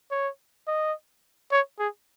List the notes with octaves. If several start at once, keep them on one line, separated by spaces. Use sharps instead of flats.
C#5
D#5
C#5
G#4